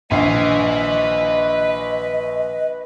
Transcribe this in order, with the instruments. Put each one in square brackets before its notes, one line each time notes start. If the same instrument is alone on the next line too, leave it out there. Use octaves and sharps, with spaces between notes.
[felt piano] A#1 C7 [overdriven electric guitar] B4 G#5 [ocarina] D#5